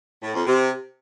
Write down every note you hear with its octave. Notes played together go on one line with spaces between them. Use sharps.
A2
F2
C3